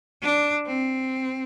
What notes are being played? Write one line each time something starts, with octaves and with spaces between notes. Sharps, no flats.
D4
C4